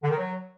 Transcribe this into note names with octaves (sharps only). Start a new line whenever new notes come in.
D3
D#3
F#3